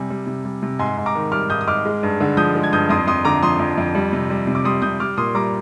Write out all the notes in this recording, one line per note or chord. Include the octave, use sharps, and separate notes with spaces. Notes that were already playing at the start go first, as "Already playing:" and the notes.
Already playing: C3 G3 G#5
G3
C3
G3
C3
G#2 G#5 C6
G#2
A#5 D6
D#3
G3 D6 F6
G#2 D#6 G6
D#6
G#2 D6 F6
G#3
G2
D3
F3 D#6 G6
G#3
G#6
G2 D#6 G6
F2 C6 D#6
F2 C6 D#6
D3 A#5 D6
F3 C6 D#6
F2
F2
G3
C3
G3
C3
D6
G3 C6 D#6
C3 D#6 G6
G3 D6 F6
A#2 C6 D#6
G3 A#5 D6